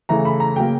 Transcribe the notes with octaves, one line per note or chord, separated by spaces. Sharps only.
C#3 E3 A3 A#5
B5
A#5
C#3 F#3 A#3 G5